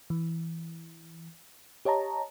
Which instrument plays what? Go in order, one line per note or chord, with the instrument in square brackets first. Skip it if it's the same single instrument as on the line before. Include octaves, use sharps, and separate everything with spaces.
[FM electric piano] E3
G4 C#5 D#5 A5 A#5